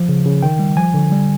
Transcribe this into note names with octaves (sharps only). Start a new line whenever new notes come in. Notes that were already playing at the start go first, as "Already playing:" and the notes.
Already playing: F3
C#3
C#3
D#3 G5
G3
F3 G#5
D3
G3